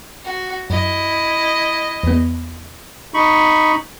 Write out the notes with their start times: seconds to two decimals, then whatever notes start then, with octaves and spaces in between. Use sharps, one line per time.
0.25 F#4
0.70 F#2 E4 D#5
2.03 E2 B3
3.14 D#4 B5 C#6